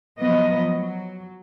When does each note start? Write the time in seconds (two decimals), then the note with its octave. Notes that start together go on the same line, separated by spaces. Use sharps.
0.18 F3 F#3 B3 D#5
0.73 F#3